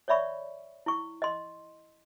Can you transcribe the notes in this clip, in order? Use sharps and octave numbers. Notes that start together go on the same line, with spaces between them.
C#5 D5 E5 B5 C#6
E4 C#6
D#5 C6